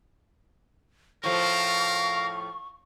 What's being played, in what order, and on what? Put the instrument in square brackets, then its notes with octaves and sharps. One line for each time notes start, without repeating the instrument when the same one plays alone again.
[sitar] A2 F3 A3 [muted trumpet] A#4 [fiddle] F5 [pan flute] C#6